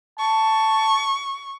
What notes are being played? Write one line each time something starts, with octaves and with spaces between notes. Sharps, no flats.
A5 C#6